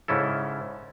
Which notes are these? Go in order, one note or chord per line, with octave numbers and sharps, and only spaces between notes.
G#2 C#3 C#4 E4 A4